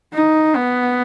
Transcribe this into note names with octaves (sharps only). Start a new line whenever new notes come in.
D#4
B3